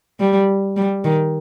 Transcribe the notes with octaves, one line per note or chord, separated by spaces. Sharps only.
G3
G3
D#3